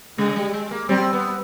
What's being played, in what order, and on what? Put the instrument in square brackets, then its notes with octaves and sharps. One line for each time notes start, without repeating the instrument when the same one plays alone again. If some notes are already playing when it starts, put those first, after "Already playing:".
[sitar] C#3 [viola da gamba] G#3
[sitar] G3
G#3
A#3
[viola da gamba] G3 [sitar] C4
[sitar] B3